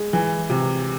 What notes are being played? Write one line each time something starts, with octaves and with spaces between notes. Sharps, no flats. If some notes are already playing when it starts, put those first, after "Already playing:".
Already playing: G#3
E3
C3